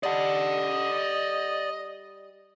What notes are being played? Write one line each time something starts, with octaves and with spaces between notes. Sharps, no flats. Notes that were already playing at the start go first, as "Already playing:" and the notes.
G3 D5 D#5 F#5